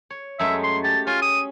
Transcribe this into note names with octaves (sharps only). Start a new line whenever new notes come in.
C#5
F#2 G#3 A3 E5
C6
G4 A5
C#4 F4 G#5 C6
D#6